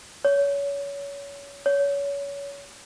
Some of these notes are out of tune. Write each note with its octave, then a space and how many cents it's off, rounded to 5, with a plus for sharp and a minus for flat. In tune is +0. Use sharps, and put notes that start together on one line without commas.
C#5 +30
C#5 +30